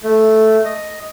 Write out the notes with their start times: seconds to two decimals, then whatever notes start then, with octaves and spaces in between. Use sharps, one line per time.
0.04 A3
0.65 D#5